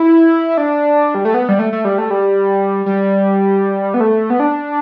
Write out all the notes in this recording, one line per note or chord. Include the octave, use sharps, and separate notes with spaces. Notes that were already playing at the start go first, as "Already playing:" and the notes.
Already playing: E4
D4
G3
A3
B3
G3
A3
A3
G3
A3
G3
G3
B3
A3
B3
D4